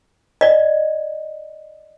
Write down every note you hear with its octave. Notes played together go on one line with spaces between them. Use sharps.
D5 D#5